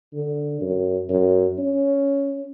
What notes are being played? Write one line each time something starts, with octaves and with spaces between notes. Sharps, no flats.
D3
F#2
F#2
C#4